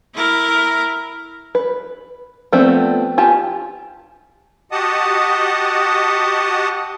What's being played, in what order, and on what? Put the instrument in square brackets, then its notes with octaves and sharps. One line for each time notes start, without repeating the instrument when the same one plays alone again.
[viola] E4 A#4
[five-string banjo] B4
F3 A3 B3 C4 D4
F4 G4 G#5 A5
[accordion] F#4 G4 D#5 F#5 A5 D#6